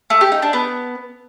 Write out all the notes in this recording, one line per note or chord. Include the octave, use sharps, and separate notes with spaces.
A3
G4
D#4
D4
B3